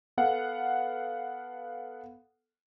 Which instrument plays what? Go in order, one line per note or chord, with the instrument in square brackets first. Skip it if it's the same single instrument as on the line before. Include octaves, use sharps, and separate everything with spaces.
[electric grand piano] B3 A4 F5 F#5